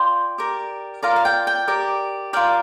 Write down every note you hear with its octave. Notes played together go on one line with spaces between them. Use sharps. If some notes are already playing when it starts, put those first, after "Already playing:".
Already playing: F4 D5 G5 C6
G4 A#4 D5
F4 A#4 D5 F5 A#5
F5
G5
G5
G4 A#4 D5
F4 A#4 D5 G5